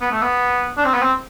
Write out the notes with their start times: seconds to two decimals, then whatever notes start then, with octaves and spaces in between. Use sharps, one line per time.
0.01 B3
0.12 A3
0.22 B3
0.77 D4
0.85 C4
0.94 B3
1.02 C4